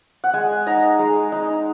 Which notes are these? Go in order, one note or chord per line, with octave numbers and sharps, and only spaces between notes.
F#5
G#3 G#5
D#4 A#5
G#3
D#4